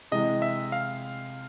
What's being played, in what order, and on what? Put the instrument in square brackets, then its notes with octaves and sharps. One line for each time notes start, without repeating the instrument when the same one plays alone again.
[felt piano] C3 E3 G#3 [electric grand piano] D#5
[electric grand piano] E5
F5